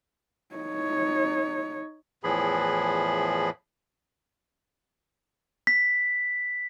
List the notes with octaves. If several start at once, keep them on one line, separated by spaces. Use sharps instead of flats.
D#4 C#5
E2 A2 E3 F3 G#4 B5
B6